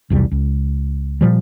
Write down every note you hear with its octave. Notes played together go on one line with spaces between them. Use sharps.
B1 E2 C3 G3
C#2
A#2 F3 G3